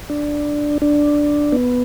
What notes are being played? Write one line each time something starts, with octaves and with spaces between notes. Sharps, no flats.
D4
D4
B3